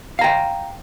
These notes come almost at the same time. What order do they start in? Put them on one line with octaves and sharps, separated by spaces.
F5 A#5 G5